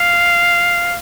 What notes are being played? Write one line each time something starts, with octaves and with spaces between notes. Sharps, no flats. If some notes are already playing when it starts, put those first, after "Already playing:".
Already playing: F5